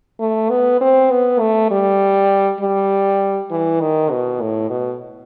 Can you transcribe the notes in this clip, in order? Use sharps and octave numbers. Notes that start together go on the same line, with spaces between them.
A3
B3
C4
B3
A3
G3
G3
E3
D#3
B2
A2
B2